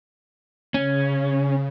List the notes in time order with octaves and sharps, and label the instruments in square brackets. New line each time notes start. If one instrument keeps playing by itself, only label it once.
[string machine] C#3 [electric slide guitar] C#4